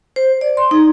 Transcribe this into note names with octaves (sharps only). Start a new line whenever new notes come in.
C5
D5
C6
D#4